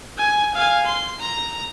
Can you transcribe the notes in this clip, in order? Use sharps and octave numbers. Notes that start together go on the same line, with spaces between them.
G#5
F5 G#5
C6
A#5